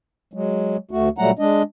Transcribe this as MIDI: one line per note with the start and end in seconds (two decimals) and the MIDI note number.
0.33 0.77 54
0.33 0.77 56
0.91 1.09 38
0.91 1.09 57
0.91 1.09 66
1.18 1.31 46
1.18 1.31 54
1.18 1.31 55
1.18 1.31 57
1.18 1.31 78
1.18 1.31 82
1.39 1.63 56
1.39 1.63 62
1.39 1.63 75